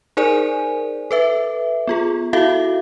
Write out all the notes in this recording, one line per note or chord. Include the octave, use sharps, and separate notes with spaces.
D#4 G#4 A#4 C5 D5 G#5
A4 B4 E5
B3 F4 G#4
E4 F#4 A4 E5 F5